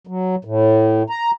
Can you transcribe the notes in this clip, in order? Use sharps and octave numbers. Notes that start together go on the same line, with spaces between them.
F#3
A2
A#5